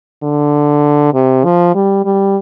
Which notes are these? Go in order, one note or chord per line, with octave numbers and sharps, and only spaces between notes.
D3
C3
F3
G3
G3